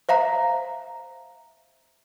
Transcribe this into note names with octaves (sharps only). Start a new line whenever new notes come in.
C5 E5 F5 A#5